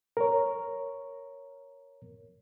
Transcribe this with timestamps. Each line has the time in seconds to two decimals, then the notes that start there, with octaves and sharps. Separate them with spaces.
0.17 A#4 C#5